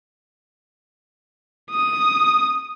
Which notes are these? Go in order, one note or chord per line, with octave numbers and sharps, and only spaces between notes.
D#6